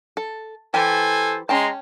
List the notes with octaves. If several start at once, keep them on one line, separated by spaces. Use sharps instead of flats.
A4
E3 G4 A4 C5 G#5
G#3 C#4 G5 A5 A#5 C6